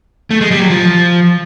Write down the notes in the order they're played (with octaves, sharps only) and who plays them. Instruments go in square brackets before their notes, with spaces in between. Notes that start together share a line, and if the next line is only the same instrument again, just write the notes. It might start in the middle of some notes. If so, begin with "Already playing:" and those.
[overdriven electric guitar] A3
G#3
G3
F#3
F3